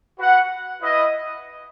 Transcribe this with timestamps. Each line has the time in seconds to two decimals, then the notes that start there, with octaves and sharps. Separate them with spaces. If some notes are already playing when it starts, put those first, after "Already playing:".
0.18 F#4 B4 F#5
0.82 E4 B4 D#5